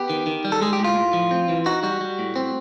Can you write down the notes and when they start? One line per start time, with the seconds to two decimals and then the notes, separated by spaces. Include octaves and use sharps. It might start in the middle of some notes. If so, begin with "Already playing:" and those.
Already playing: B3 G4
0.10 D#3
0.27 D#3
0.45 G3
0.52 A4
0.61 G#3 G#4
0.73 G4
0.79 A2
0.84 F4
0.96 A2
1.13 F3
1.31 C4
1.49 E3
1.66 D#4 F#4
1.83 G3 F#4
2.01 G3
2.19 A2
2.36 C4